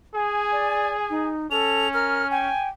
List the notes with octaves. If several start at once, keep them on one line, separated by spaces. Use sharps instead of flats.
G#4 G#5
D5
D#4
C#4 A4 F7
A#4 F6
G5 G#5